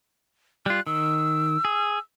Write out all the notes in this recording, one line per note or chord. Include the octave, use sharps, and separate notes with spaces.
G3 F4 F#6
D#3 E6
G#4